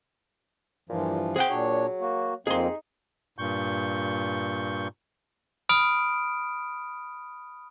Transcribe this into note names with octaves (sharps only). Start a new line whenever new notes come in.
G2 A#2 E3 F3
C4 G#4 F#5 G5
A#2 F#3 D4 C#5
A#3 F#4
F2 A#3 C4 D#4 G#4 C6
G2 A#2 C#6 G6
B5 D#6 F6 D7